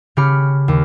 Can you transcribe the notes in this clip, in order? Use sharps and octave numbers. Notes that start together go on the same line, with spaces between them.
C#3 C#4 G4 B5 F6 C#7
D#2